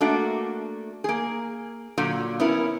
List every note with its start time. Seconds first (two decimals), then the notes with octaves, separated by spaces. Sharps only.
0.01 A3 A#3 D4 F#4
1.04 A#3 G#4
1.98 A#2 D3 F#3
2.40 B3 C#4 E4 A#4